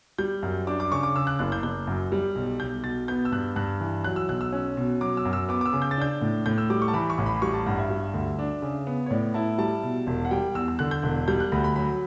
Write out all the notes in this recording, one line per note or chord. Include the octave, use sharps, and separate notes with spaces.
G3 G6
F#2
D4 D6
D6
C#3 C#6
D6
C#3 E6
F#6
F#1 F#6
G6
F#1 G6
F#2
G3
B1
B1 G6
B2 A6
B3 G6
E6
G2 F#6
G2 F#6
E3
F#3 F#6
E6
B1 F#6
E6
C#4
B2
F#3 D6
E6
F#2
E6
B3 D6
D6
E6
C#3
G6
A6
D4 G6
A2
A2 G6
E6
G3 D6
C#6
A5
E3 B5
C#6
A1
B5
G3 C#6
A5
G2 F#5
E5
G3
D2
D4
C#3
B3
C#5
A2 D5
E4 A5
G3 A5
B2
E1
F#5
G3 G5
E2 E6
E6
D3 F#6
G6
E1
G3 G6
F#6
D2 B5
B5
F#3 B5